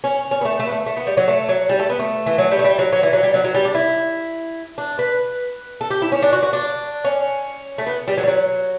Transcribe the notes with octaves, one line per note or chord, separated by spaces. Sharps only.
C#4
C#4
B3
A3
A3
B3
A3
A3
B3
G3
F#3
A3
F#3
G3
A3
B3
A3
E3
F#3
G3
A3
G3
F#3
F#3
E3
F#3
G3
F#3
F#3
G3
D4
E4
D4
B4
A4
G4
E4
C#4
D4
F#4
F#4
D4
C#4
A3
B3
G3
F#3
G3
F#3